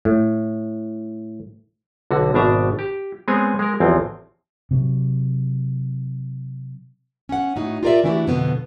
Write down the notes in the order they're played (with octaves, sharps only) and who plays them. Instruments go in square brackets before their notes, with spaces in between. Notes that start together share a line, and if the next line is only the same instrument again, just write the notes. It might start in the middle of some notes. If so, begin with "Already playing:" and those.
[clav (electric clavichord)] A2
B1 D3 F#4
G#1 B2 D4 E5 A#5
G4
G#3 B3 C4 G#4 C#5 G#5
G#3 A#4
A1 E2 F3 C4
[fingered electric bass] C3 F#3
[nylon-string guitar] C#4 F#5
A2 D#4 F#4
F4 G4 A#4 C#5 D5 E5
E3 A3 D4 E4 F#4 G4
F2 B2 D3 B3